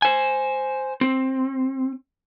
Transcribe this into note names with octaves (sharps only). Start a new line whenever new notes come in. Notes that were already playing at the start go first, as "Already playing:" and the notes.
C5 G#5
C4